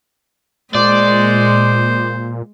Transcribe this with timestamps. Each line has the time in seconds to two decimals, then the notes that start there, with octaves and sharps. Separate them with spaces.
0.75 A#2 G#3 C5 D5